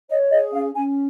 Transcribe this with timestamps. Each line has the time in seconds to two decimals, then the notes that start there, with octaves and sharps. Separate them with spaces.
0.09 C#5 D#5
0.31 G#4 D#5
0.53 C#4 F5
0.75 C#4 G#5